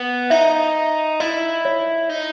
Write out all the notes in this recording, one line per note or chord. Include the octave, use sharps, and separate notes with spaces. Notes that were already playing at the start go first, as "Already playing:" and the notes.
Already playing: B3
D#4 E5
E4 D#5
C#5
D#4